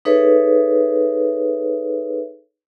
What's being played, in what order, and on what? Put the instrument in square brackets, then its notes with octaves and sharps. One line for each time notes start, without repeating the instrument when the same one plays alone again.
[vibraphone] D#4 G#4 A4 B4 C#5 E5